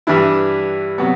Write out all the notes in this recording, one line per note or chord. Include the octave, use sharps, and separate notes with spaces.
G2 E3 G3 D4 E4
C3 F#3 B3